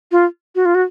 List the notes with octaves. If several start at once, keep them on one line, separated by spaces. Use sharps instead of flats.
F4
F#4
F4
F#4